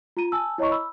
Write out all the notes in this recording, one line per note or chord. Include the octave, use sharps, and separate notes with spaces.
F4 A#5 D#7
G#5 A5 E6
E4 C#5 D#5 A#5 C#6
B5 E6